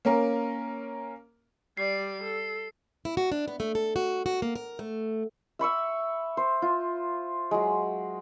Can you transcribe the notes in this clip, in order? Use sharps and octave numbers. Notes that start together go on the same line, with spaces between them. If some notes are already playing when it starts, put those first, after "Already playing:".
A#3 C#4 A#4
G3 D5 C7
A4
E4
F#4
D4
B3
A3
A4
F#4
F#4
A#3
A#4
A3
E5 B5 C#6 E6
C5
F4
F#3 G#3